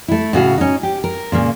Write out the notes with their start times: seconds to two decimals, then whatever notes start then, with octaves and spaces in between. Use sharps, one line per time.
0.08 A3 E4
0.33 A2 C#3 F#4 F5
0.58 C#4 D#4
0.83 G4
1.04 A#4
1.32 A#2 C#3 A#3